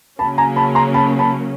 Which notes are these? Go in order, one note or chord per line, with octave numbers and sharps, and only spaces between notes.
C#3 F#3 A#3 C#4 A5 B5
G#5 A#5
A5 B5
A#5 C6
A5 B5
A5 B5